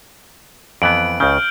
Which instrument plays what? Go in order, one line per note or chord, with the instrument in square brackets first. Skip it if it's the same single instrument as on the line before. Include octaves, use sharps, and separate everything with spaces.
[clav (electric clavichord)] F2 E3 B3 [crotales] D7 F#7
[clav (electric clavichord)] C#2 C#3 [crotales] F6 G6